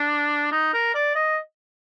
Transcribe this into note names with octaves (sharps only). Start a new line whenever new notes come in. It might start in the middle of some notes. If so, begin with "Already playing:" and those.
Already playing: D4
D#4
A#4
D5
D#5